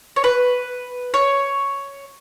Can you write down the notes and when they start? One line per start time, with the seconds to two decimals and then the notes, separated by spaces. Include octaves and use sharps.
0.16 C#5
0.24 B4
1.14 C#5